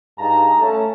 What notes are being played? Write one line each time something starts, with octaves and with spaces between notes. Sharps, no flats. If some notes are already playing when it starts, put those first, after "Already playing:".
G2 D#4 G#4 F5 A5 A#5
A3 C#4 A5